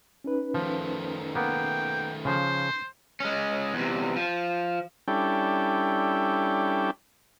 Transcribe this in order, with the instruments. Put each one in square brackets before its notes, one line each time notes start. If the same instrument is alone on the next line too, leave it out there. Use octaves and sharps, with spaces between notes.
[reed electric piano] C#4 D#4 B4
[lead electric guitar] D#3 A3 [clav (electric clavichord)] F3
[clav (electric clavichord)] A#3 B3 [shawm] G5
[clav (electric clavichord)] C#3 F3 [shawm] C5
[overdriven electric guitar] G#3 C#4
E2 C3
F3
[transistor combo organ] G3 C#4 D4 E4 A4 G5